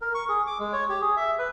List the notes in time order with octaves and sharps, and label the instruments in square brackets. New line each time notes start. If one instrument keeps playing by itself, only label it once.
[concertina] A#4
C#6
G#4
D6
G#3
C#5
G4
G#4
E5
B4